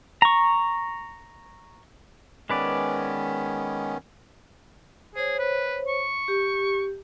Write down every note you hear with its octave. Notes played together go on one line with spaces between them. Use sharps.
A#5 C#6
D#3 G#3 B3 C#4 B4 D5
G#4 C5 C#5
B4
C#6
G4